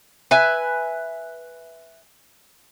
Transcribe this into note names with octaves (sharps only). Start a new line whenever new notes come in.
B4 E5 G#5